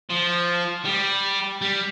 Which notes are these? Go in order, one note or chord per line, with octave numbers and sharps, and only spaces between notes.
F3
G3
G3